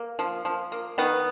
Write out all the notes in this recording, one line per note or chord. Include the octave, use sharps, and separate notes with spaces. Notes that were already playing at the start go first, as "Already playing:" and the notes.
Already playing: A#3
F3
F3
A#3
D#3 B3